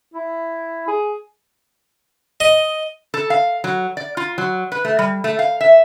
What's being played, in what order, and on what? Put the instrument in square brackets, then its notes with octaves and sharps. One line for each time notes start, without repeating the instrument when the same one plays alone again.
[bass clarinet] E4
G#4
[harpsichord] D#5
[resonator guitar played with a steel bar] A4
F5
F#3
D5
F4
F#3
B4
A3
G3
A3
F5
E5